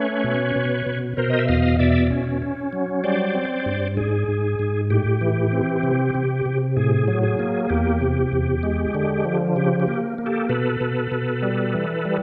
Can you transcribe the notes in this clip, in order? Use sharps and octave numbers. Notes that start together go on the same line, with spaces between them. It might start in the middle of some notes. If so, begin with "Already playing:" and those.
Already playing: A3 C#4 B4 C#5
B2
B2
B2
B2 A#4 C5
D#5
E5
E2 D#5 F5
B2 D5 E5
C#4
C#4
F#3
G3 C5 D5
C4
G2
G#2 G#4
G#2
G#2
A2 G4
E3
C4
C3
C3
C3
A2 G#4
F#3
G#4
A#3
G#4
E2 G4
C3
E2
G#3
D3
F3
C#3 G4
G4
A#3
A#3
G4 A4
B2 A4 B4
B2
B2
G3
E3
G3